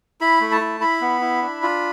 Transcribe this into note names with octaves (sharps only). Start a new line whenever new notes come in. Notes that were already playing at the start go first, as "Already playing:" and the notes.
E4 B5
A3
A5
E4
E4 B5
B3
E4
D4
F4